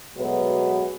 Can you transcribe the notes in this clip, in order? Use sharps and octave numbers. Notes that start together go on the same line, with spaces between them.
B2 F#3 G#3 A3 B3